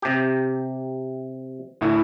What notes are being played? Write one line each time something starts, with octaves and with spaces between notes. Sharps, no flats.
C3 G4
D2 A2 E4